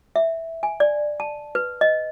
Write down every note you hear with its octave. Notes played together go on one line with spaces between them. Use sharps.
E5
G#5
D5
A5
B4
D#5